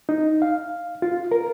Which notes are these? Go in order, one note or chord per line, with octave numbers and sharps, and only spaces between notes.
D#4
F5
F4
A#4